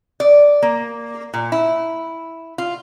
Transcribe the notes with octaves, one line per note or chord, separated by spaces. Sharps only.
D5
A#3
A#2
E4
F4